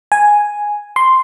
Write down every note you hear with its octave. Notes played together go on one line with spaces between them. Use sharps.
G#5
C6